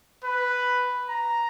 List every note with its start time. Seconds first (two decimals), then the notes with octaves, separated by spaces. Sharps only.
0.25 B4
1.09 A#5